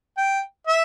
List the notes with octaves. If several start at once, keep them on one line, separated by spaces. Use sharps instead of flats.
G5
E5